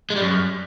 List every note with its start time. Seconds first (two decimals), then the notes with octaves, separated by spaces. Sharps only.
0.10 G#3
0.16 G3
0.21 F#2